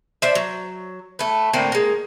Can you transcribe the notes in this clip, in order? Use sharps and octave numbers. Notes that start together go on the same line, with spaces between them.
D4 C5 E5
F#3
A3 B4
A2 D3 A#3 C4
G#3 A#3